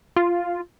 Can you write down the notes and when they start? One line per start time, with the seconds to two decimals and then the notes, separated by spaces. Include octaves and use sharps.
0.16 F4